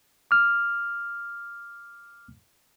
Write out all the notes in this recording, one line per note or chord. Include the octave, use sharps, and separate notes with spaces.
D6 F6